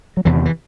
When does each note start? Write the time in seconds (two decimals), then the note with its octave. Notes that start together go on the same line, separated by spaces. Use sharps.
0.17 F#3
0.25 E2 C3 E3
0.35 D#3
0.45 E3